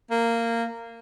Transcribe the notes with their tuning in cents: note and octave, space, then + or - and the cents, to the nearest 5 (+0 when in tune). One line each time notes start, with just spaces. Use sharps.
A#3 -15